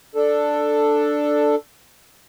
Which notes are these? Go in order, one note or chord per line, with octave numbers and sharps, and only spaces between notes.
D4 A4